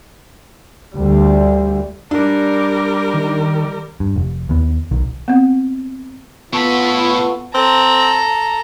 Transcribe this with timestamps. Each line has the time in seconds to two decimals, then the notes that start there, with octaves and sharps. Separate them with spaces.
0.95 D2 G3
2.11 G3 D4 A#4
3.14 D#3
4.00 G2
4.16 F1
4.49 D#2 B3
4.91 B1 D#3
5.28 B3 C4
6.54 A2 B3 F4 A4 B5 C#6
7.54 C4 A4 A#5